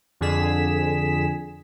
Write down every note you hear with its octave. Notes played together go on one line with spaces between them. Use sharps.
F2 D3 G#4 B6 E7